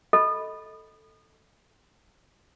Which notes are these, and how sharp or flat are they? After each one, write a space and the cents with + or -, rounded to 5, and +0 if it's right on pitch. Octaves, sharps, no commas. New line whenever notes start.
A4 +0 D#5 +10 B5 +0